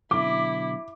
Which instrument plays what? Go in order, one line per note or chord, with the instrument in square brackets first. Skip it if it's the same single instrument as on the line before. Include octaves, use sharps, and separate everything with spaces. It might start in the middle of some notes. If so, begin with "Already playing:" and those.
[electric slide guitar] B2 D3 F#3 [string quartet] E4 [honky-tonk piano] D6